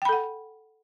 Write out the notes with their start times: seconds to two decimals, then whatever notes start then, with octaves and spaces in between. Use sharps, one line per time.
0.02 G5
0.05 B5
0.09 A4
0.13 F#5